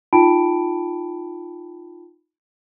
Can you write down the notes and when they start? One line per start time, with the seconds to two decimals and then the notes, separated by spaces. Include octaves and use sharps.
0.13 D#4 F4 G5 A5 B5 D7